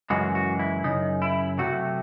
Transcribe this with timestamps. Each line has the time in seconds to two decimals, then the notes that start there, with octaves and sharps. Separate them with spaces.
0.10 F#2 C#3 E3 G#3 F#4
0.35 F#4
0.59 E4
0.84 F#2 C#3 D#4
1.22 E4
1.58 C3 F#3 A3 F#4